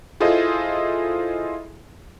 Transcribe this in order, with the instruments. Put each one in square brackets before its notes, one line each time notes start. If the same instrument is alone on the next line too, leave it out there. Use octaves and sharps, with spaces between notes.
[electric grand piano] E4 F4 G#4 A4 C5 D#5